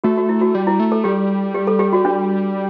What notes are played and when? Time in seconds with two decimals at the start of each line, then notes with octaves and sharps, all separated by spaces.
0.04 A3 F#4
0.17 F#4
0.29 E4
0.41 F#4
0.55 G3
0.67 E4
0.80 A3
0.92 A4
1.04 G3 G4
1.55 G4
1.67 A4
1.79 G4
1.93 F#4
2.05 D4